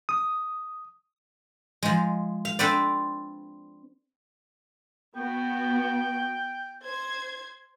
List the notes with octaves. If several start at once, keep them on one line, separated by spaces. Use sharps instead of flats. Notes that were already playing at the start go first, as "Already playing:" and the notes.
D#6
F3 G#3
F5
C4 D4 A4 B4 C5 D5
B3 F#4 G5
C5 G#6